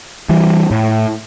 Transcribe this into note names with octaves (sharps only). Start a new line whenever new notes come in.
E3 G3
A2